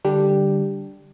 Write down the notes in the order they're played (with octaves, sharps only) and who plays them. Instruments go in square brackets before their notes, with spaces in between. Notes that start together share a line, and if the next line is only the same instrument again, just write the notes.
[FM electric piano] D3 G3 D4 G4